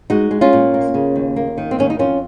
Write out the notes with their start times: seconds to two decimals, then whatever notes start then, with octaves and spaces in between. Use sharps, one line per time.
0.10 G#3 D#4 F#4
0.31 G#3
0.41 C#4 F4
0.53 A#2
0.74 A#3
0.94 C#3
1.16 D#2
1.36 A#3
1.58 D#3
1.71 C4
1.79 D#2 C#4
1.90 D#4
1.99 F2 C#4 F4